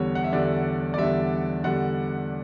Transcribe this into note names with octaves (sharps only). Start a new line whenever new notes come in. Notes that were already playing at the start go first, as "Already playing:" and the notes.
Already playing: E2 D3 G3 C#5
F#5
E5
E2 D3 G3 D5
D5
E2 D3 G3 E5
E2 D3 G3 F#5